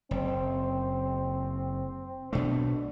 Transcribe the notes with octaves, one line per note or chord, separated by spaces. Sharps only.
F#1 C4
B1 B2 A3 D4